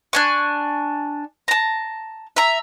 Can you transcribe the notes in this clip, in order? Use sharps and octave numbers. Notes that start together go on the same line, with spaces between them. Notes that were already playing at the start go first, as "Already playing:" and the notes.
D4 G#5 C#6
A5 A#5
E5 A#5